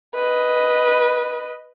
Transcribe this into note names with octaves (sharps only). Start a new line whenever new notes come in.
B4 D#5